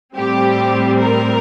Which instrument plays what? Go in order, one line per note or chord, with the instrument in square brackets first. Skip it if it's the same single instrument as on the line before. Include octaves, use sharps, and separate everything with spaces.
[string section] A2 G3 C4 G4
A#4